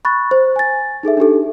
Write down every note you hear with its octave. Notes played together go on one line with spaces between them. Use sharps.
B5 C#6 F#6 A6
C5
G#5 A6
D#4 G#4 A4 E5
D4 D#4 G4 A4